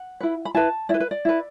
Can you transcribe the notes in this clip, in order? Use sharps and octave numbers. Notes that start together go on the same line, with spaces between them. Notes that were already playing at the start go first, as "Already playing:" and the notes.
Already playing: F#5
E4 B4
B5
E4 B4 A5
E4 B4 D5
B4
D5
E4 B4